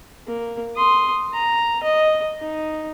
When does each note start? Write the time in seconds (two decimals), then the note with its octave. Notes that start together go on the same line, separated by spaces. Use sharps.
0.27 A#3
0.76 C6 D#6
1.33 A#5
1.83 D#5
2.40 D#4